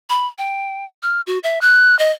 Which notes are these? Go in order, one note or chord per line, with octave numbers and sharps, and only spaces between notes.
B5
G5
F6
F#4
E5
F#6
D#5